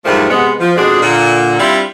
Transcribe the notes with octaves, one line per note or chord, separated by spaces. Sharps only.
E2 G#2 F3 G3 A3 A#4
C3 G#3 B3
F3
F2 B2 G#3 D4 G#4
A#2 D3 A#3
G3 C4 D4 E4 F4